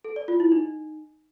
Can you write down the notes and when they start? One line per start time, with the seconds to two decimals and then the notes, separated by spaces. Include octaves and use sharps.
0.05 A4
0.16 D5
0.28 F4
0.40 E4
0.52 D#4